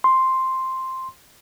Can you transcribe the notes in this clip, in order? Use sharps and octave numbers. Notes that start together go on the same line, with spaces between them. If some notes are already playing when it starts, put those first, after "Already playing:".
C6